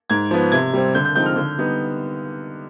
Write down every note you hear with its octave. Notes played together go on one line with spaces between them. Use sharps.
G#2 G#6
F3 B3
C3 G#6
G3 C4
D3 G6
G6
F3 G#3 C4 D#4 G6
F6
D3
G3 B3 D#4